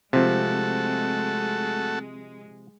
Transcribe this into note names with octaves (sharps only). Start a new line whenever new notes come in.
C3 F3 G#3 A3 C4 F#4 A4